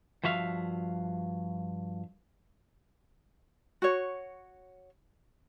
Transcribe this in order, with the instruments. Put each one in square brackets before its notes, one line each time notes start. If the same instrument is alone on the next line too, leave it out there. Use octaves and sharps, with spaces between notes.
[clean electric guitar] G2 F3 F#4 E5 F5
[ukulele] F#4 C#5